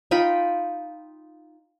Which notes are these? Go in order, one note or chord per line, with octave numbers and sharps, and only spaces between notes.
D#4 F4 G5 B5